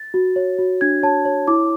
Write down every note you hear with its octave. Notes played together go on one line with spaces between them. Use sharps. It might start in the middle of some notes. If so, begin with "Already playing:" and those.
Already playing: A6
F#4
C#5
F#4
D4 G#6
C#5 A5
C#5
E4 D6